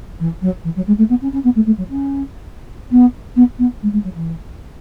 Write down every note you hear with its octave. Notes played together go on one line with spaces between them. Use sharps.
E3
F#3
E3
F#3
G#3
A3
B3
C#4
C#4
B3
A3
A3
F#3
C#4
B3
B3
B3
G#3
G#3
F#3
E3